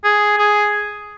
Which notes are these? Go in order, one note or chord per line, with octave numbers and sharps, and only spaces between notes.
G#4
G#4